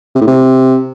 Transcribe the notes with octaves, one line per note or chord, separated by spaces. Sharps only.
C3
A2
C3